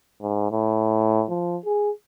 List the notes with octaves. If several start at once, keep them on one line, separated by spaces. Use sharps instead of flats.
G#2
A2
F3
G#4